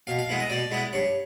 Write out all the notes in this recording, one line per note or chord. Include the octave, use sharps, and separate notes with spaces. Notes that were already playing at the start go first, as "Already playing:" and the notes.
B2 F5
F5
G#3 B3 E4
D#5
B2 D5
G#3 B3 E4
G2 C#5